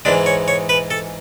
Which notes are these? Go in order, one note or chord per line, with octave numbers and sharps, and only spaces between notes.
G#2 E3 G#3 D4
C#5
C#5
B4
A4